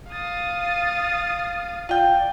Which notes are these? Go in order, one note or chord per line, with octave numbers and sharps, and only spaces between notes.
F5 D#6 A6
F4 D5 G5